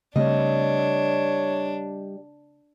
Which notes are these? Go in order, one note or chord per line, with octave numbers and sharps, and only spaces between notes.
C#3 G3 A3 C4 D4 C#5 D#5